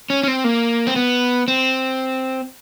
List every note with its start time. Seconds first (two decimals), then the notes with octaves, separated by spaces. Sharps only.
0.10 C#4
0.23 C#4
0.28 C4
0.44 A#3
0.87 C4
0.96 B3
1.48 C4